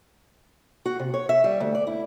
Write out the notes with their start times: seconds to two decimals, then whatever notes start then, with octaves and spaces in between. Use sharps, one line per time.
0.85 F#4
0.99 C3
1.14 C#5
1.29 E5
1.44 G3
1.60 D2
1.75 D5
1.87 E4